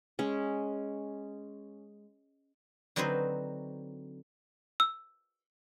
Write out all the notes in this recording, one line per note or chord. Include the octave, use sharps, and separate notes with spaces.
G#3 C#4
D3 F#3 C4 D#4 B4 C5
E6